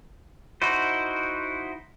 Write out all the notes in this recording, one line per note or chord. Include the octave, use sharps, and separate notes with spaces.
D#4 E4 F#4 C5